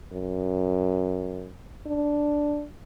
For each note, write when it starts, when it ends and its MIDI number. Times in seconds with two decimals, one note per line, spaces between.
0.12 1.52 42
1.87 2.65 62